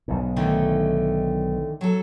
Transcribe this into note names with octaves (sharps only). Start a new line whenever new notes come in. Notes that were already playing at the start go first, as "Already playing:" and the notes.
B1 G#2
D3 D#3 A3
F#3 A4